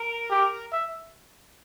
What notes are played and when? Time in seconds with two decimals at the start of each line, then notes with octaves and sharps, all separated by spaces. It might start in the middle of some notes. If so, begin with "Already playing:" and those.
Already playing: A#4
0.31 G4
0.73 E5